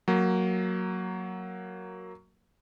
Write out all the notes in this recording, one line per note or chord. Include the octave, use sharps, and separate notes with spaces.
F#3 A#3